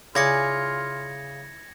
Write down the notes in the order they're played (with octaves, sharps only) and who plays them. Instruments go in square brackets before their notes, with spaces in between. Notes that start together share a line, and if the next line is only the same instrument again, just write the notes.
[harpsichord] C#3 [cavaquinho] E4 D5 G#5 [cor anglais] F4 [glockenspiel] G#6 A#6 C#7